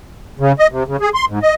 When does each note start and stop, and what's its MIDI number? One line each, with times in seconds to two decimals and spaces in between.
0.40 0.52 49
0.59 0.67 75
0.72 0.83 48
0.88 0.97 49
1.01 1.09 68
1.15 1.25 84
1.28 1.39 44
1.42 1.54 75